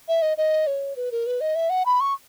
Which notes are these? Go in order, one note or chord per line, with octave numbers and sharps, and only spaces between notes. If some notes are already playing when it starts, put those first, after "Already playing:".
E5
D#5
D#5
C#5
B4
A#4
B4
D#5
E5
F#5
B5
C#6